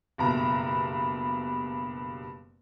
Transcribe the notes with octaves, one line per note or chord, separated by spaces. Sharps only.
F#1 G2 B2 A#5